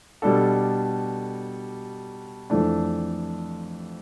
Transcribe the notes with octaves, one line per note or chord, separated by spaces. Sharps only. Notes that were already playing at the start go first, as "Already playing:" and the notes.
B2 G3 D4 A4
F2 E3 A3 D4